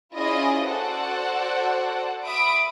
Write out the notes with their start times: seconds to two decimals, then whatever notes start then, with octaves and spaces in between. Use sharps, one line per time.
0.15 C#4 E4 F4 G#4 D5 D#5
0.66 F#4 A4 C5 D5 F#5
2.24 E5 B5 D6 D#6 D7